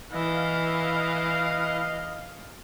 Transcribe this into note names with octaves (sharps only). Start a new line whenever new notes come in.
E3 D#5 F5